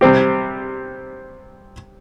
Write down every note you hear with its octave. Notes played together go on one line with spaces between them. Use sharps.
C3 G3 C4 G4